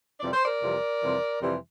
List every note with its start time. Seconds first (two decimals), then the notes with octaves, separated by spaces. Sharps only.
0.20 F2 C3 E3 G3 D5
0.33 C5
0.45 A#4 D5
0.61 F2 C3 E3 G3
1.01 F2 C3 E3 G3
1.41 F2 C3 E3 G3